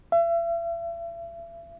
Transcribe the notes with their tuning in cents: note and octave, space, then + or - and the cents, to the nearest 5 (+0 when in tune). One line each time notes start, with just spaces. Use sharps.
E5 +40